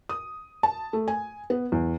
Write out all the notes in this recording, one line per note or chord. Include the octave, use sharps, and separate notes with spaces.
D#6
A5
A3
G#5
B3
E2